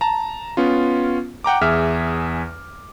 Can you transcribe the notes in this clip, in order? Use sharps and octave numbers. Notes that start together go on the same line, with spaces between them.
A5 A#5
B3 C#4 F4
F#5 G5 A#5 D6
E2 G#4 E5 F6